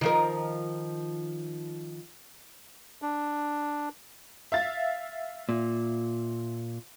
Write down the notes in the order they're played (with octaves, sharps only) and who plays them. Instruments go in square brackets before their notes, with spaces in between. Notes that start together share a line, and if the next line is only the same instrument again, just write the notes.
[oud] D#3 F3 A#4
[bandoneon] D4
[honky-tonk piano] E5 F5 A6
[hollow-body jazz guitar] A#2